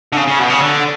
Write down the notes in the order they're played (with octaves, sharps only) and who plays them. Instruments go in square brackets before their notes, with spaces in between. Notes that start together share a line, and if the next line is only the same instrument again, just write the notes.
[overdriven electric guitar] D3
C#3
C#3
B2
C#3
D3